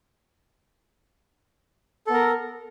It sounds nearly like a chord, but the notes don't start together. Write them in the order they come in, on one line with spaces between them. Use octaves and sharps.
A4 B3 A#4